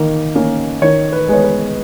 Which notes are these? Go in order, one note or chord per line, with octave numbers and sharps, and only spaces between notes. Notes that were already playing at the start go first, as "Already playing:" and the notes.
Already playing: D#3 A#3
A#3 C#4
D#3 C#5
B4
G#3 B3 C#5
B4